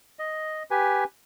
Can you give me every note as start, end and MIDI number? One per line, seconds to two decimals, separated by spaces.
0.19 0.63 75
0.71 1.04 67
0.71 1.04 71
0.71 1.04 80